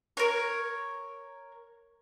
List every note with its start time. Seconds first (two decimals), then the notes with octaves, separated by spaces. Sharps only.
0.17 A#4 C#5